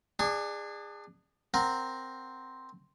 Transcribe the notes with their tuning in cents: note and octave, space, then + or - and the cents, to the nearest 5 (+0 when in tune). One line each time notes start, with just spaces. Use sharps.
D4 +20 G#4 -20 C#6 +0
C4 +0 A#4 +0 F#5 +0